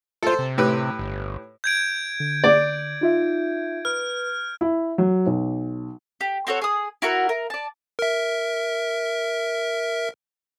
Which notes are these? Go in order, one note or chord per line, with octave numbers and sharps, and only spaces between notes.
F4 A4 C5
C3
A2 G4 B4
G1
G6 G#6 D7
D3
D5
D#4 F4 E5
B4 F6
E4
F#3
B1
G4
C4 F#4 A4 C#5
G#4 D#6
E4 F#4 A#4 F#5
A#4
D5 A5
A#4 E5